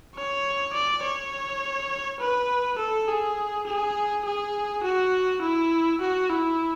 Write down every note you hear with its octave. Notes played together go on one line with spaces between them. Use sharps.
C#5
D5
C#5
B4
A4
G#4
G#4
G#4
F#4
E4
F#4
E4